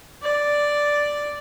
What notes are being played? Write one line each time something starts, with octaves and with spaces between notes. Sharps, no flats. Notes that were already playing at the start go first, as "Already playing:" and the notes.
D5